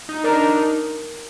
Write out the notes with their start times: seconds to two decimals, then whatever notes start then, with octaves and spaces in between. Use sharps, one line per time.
0.09 D#4
0.24 D4 A#4
0.40 D4
0.56 D#4